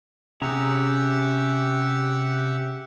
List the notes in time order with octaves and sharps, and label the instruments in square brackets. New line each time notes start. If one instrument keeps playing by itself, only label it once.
[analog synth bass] C3 [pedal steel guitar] C#4 G#4 A#5 [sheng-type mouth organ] G4 E5 F#5